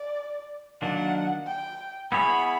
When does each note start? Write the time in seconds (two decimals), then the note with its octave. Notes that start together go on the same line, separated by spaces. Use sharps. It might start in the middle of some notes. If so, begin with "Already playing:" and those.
Already playing: D5
0.82 D#3 F#3 A#3 D4 F#5
1.47 G5
2.11 B3 E4 G#4 C#5 B5